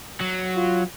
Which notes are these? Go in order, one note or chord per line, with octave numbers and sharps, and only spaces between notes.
F#3
F4